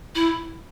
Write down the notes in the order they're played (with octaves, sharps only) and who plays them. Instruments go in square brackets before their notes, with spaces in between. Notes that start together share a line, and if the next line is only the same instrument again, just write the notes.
[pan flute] E4